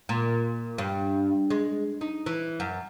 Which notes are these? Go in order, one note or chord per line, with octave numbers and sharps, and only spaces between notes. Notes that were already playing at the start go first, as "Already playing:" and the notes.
A#2
G2
G#3
D#4
E3
F#2